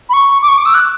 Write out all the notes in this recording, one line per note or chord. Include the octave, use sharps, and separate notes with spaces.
B5
C#6
D6
C#6
D6
E6
F#6